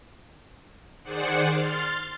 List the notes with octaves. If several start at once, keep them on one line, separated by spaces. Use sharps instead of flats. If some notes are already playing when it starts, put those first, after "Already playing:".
D#3 G#4 C5 D5 F#5 C#7
C6 F6 A6